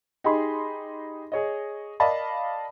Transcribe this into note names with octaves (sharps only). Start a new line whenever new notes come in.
D#4 G4 G#4 D#5 B5 C6
G#4 C#5 D#5
A#4 D5 D#5 F5 A5 B5